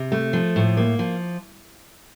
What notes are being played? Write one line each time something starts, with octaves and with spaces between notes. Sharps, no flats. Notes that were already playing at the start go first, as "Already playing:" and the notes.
Already playing: C3
A3
F3
A2
A#3
F3